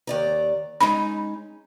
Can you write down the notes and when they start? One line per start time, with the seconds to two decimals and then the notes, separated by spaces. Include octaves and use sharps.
0.07 D#2 D5 A#5
0.81 G#3 C#4 D#4 B5